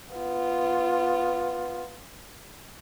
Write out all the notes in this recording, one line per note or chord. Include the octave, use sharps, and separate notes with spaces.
B3 F4